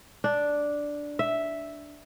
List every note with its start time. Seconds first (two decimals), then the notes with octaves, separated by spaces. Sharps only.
0.24 D4
1.19 E5